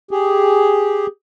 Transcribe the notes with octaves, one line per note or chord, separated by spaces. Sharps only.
G4 G#4